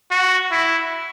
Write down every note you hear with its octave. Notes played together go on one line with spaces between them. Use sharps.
F#4
E4